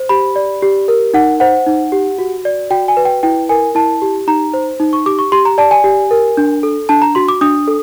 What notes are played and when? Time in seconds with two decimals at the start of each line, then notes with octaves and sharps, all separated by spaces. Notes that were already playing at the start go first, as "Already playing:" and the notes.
Already playing: C5
0.09 G4 B5
0.36 D5
0.62 G4
0.88 A#4
1.14 D#4 F#5
1.40 C5 F#5
1.67 D#4
1.92 G4
2.19 F#4
2.45 D5
2.70 F#4 G5
2.88 G#5
2.97 B4
3.05 G5
3.23 E4 G5
3.49 A#4 G#5
3.75 E4 A5
4.02 G4
4.27 D#4 A#5
4.54 C5
4.80 D#4
4.93 C#6
5.06 G4 D6
5.19 C#6
5.32 G4 C6
5.45 A#5
5.58 D5 A5
5.71 G#5
5.84 G4
6.11 A#4
6.37 D4
6.63 A4
6.89 D4 A5
7.02 A#5
7.15 F#4 C6
7.28 D6
7.41 D4 D#6
7.68 A4